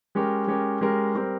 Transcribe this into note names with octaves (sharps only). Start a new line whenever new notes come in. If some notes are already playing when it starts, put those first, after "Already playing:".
G#3 C#4 G4 A#4
G#3 C#4 G4 A#4
G#3 C#4 G4 A#4
G3 C4 G4 A#4